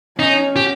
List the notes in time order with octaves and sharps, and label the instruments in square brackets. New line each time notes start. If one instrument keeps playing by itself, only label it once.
[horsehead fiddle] C#4 [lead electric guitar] D#4
[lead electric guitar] G4